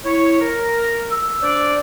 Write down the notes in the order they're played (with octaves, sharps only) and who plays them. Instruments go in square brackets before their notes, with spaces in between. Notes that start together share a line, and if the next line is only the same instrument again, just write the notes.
[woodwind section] E4 C#5
A#4
[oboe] E6
[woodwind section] D4 C5 D5